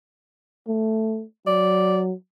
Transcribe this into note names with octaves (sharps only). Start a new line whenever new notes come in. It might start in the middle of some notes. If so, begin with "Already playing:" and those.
A3
F#3 D5